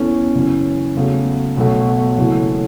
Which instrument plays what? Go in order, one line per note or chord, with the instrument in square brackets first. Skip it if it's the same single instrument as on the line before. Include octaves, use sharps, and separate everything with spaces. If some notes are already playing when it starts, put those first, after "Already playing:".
Already playing: [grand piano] E2 E3 C#4 A4
F#1 F#2 E3 C#4
E2 C#3 F#3 A3
B1 B2 F#3 A3 F#4
F#1 F#2 E3 A3 F#4